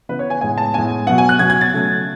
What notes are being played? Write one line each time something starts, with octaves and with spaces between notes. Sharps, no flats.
C#3 E3 B3 B4
C#5
G#5
A2 G#3 B3 G#5
A5
A2 G#3 B3 G#5
B2 F#3 B3 F#5
G#5
F#6
B2 F#3 B3 G#6
G#6
A6
C#3 F#3 A3